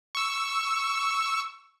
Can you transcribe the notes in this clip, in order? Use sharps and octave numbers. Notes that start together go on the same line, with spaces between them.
C#6 E6